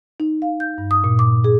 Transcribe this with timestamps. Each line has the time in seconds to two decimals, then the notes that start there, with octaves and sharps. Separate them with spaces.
0.20 D#4
0.42 F5
0.60 G6
0.78 G2
0.91 D#6
1.04 A#2
1.19 D6
1.44 G#4